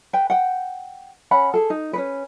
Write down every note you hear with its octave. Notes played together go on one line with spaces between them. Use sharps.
B4 G5
F#5 G5
C#4 F#5 B5
G#4 A4
D#4
C#4 D#4 B4